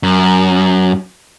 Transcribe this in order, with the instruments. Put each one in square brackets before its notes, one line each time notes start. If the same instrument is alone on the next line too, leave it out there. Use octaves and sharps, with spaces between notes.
[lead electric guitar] F#2